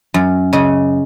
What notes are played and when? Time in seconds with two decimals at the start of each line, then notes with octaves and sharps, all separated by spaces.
0.14 F#2
0.53 C#3 D#5